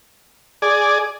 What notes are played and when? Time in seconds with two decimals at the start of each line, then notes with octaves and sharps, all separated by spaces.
0.62 G#4 D5